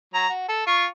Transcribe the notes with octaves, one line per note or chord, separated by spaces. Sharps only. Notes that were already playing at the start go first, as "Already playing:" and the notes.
F#3 A#5
F#4
A4
F4 C#6